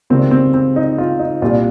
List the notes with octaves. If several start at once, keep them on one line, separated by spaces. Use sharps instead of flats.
C#2 C3 D#3 G3 C4
C4
C4
D#4
F4
D#4
C2 A#2 G3 F4